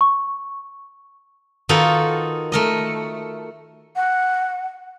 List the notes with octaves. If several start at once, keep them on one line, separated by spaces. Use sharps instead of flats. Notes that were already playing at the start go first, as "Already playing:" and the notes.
C#6
D#3 D#4 F4 F#4 A4 B4
A3 A#4 D#5
F#5